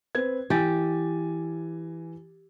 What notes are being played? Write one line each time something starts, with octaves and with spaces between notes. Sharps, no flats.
C4 B4 G#6
E3 G4 G#5 A6